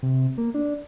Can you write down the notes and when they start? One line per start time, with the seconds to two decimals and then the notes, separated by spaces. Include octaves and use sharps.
0.03 C3
0.38 A#3
0.54 D4